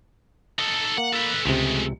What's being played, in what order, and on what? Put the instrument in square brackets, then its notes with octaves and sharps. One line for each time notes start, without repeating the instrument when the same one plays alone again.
[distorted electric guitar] D#4 A4
[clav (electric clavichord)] A#3 [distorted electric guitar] F#5
[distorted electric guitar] A4 B4
[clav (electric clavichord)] C#2 C3 [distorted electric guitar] G#3 A3